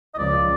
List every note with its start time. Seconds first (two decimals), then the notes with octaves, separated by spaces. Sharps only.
0.14 D#5
0.18 C#2 C#3 F3 D5